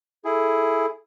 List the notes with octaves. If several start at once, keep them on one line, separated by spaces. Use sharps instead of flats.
E4 G#4 A4